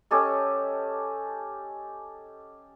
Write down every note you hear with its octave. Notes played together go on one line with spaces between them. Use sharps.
C#4 G4 A4 D#5